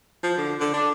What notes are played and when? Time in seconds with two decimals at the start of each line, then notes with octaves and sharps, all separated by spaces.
0.23 F3
0.38 D3
0.61 D3
0.74 D4